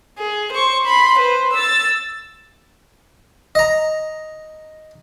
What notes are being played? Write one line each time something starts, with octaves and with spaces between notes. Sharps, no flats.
G#4
C5 C#6
B5 C6
B4 C5
E6 A6
D#5 A#5